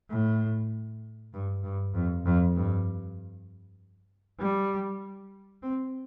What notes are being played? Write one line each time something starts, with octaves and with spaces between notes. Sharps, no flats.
A2
G2
G2
F2
F2
G2
G3
C4